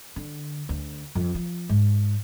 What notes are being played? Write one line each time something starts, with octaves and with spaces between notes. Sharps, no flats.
D3
D2
F2
F3
G#2